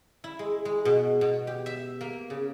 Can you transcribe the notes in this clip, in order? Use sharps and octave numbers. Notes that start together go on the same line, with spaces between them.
E4
G#3
G#3
B2
B2
G4
E5
A#3
C#3